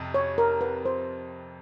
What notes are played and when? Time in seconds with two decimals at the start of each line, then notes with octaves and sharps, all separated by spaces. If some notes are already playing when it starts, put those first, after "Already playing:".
Already playing: F2 C3
0.14 C#5
0.38 A#4
0.61 B4
0.85 C5